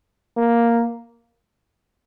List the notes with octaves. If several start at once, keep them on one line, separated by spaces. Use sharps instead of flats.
A#3